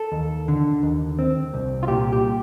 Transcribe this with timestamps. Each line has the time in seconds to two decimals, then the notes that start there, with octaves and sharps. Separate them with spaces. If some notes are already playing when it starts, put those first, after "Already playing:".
Already playing: A4
0.12 D#2
0.48 D3
0.83 D#2
1.19 C4
1.53 C2
1.83 F4
1.88 A#2 G4
2.12 G4